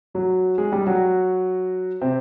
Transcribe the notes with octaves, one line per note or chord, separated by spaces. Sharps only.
F#3 F#4
G#3 G#4
G3 G4
F#3 F#4
C3 C4